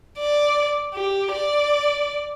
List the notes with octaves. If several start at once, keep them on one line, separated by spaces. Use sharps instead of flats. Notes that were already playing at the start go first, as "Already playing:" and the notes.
D5
G4
D5